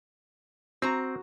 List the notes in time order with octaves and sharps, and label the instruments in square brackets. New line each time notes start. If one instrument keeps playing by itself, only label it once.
[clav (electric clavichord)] C4 [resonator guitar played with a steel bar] F#4 A#5